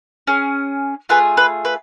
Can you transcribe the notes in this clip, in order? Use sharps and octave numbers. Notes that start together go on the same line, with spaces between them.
C#4 G#4
A3 F4 G#4 B4
B4
B4